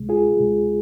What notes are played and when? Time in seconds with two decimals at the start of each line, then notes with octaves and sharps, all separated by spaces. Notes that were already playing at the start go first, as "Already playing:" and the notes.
Already playing: C#2 B2 G#3
0.09 F4 G#4
0.37 C#2 B2 G#3